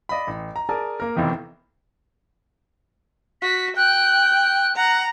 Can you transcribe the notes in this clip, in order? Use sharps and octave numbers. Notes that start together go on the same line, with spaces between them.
D5 D#5 F5 B5
A1
A#5
G#4 A#4 D5 G#5 A5
A#3 A#4
F1 E2 D#3 E3 F5
F#4 B6
G5 F#6
F#5 A#5